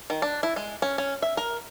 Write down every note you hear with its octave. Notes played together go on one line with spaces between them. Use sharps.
D#3
D4
E4
G#3
C#4
C#4
E5
A#4